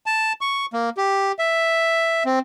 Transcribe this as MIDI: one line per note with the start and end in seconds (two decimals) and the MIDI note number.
0.06 0.33 81
0.41 0.66 85
0.73 0.90 58
0.97 1.32 67
1.39 2.23 76
2.26 2.39 60